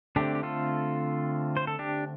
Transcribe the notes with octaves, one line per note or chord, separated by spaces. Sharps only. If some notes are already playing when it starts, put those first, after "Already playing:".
D3 A3 C4 D4 G4
G4
F4 A4
C5
A4
D4 G4